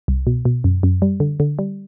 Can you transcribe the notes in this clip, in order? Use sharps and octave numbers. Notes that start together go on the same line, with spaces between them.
C2
B2
B2
F#2
F#2
G3
D3
D3
G3